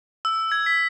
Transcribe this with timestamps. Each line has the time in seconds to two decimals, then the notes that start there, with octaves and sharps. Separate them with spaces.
0.25 E6
0.52 G#6
0.66 B6